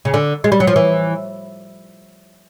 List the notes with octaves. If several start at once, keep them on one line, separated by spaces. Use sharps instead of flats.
C#3
D3
G#3
G3
F#3
F3
E3